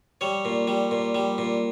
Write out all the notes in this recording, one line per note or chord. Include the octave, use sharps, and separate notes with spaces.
G3 C#5
A#2
G3
A#2
G3
A#2